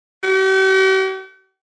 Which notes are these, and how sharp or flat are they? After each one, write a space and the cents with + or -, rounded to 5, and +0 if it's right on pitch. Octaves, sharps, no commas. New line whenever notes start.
G4 -45